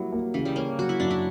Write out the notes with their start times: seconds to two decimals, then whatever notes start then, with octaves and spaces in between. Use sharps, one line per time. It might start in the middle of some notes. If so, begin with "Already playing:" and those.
Already playing: F#3 G3 A#3 E4
0.13 A#3
0.34 C#3 E3
0.45 G3
0.56 A#3 C#4
0.79 F#3 F#4
0.89 E4
1.00 F#2 D4
1.11 E4